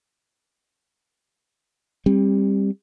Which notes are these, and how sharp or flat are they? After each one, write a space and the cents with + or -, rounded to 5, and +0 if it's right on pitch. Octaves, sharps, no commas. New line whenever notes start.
G3 +20 C4 +35